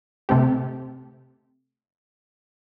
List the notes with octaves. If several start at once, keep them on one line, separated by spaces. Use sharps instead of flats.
C3 A3 C4 G4